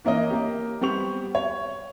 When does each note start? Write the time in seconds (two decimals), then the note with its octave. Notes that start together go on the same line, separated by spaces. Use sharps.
0.05 E3 A#3 C#4 D#5
0.30 A#3 G4
0.81 G3 B3 C4 G4 C#6 F7
1.35 C#5